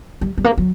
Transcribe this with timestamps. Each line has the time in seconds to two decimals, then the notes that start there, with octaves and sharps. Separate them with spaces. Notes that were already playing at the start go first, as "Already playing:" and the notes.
0.21 G3
0.38 G3
0.44 A#3
0.58 F#3